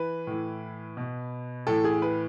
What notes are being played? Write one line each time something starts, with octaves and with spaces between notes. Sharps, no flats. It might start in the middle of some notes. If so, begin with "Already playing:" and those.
Already playing: E3 B4
A2 E3
B2
A2 E3 A4
G#4
B4